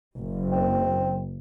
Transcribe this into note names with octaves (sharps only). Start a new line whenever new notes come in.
F#1
C4